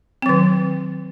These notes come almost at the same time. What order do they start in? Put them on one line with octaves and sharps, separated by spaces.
C4 F#3 D#3